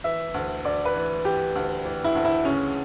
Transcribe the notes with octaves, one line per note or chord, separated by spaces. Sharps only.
E3 E5
D2
D2 D5
B4
E3
E3 G4
D2
E3
E4
D2
E4
C#3 C#4